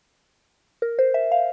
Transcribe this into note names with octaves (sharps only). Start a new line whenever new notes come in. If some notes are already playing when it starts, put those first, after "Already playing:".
A#4
C5
E5
F5